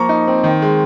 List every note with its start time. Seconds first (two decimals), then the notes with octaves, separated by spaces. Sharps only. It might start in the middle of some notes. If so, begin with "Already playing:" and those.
Already playing: F3 A#3 A#5 C#6
0.09 D#4
0.27 C4
0.44 D#3
0.62 G#3